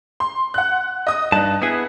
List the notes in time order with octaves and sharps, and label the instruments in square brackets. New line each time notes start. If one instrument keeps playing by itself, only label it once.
[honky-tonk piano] C6
F#5 F#6
D#5 D#6
[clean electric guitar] G2 A5 [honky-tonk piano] D#4 F#6
[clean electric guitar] B3 E4 G#4